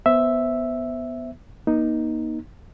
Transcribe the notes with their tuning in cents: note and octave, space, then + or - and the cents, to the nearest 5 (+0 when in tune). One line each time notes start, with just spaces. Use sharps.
B3 +0 C5 +0 E5 +0
A#3 +40 D#4 +0